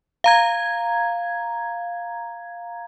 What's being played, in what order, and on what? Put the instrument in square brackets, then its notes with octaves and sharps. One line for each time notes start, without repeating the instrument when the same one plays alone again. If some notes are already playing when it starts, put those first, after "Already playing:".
[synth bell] F5 A#5 G#6